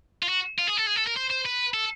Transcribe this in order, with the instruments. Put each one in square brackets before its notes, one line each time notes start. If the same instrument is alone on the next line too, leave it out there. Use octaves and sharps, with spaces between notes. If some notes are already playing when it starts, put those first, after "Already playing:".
[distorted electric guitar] F4
F#4
F4
G#4
A4
G#4
A4
A#4
C5
C5
B4
A4